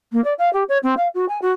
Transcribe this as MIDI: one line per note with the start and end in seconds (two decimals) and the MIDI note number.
0.13 0.23 58
0.24 0.33 74
0.38 0.52 77
0.53 0.64 67
0.69 0.78 73
0.83 0.95 60
0.97 1.08 77
1.15 1.26 66
1.29 1.39 80
1.42 1.51 66